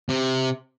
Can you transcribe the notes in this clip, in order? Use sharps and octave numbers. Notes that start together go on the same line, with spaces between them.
C3